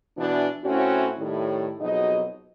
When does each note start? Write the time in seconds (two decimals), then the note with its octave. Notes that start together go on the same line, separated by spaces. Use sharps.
0.17 B2 E3 D4
0.63 A2 C4 C#4 E4 F#4
1.18 A2 D#3 G3
1.80 F2 B2 F#3 D#4 G#4 D#5